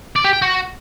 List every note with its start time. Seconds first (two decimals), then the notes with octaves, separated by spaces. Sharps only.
0.16 D5
0.24 G4
0.33 G5
0.42 F#4